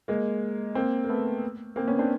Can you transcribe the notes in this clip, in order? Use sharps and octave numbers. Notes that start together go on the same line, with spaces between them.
G#3 A#3
A#3 C4
A#3
A3 B3
A#3 C4
B3 C#4
C4 D4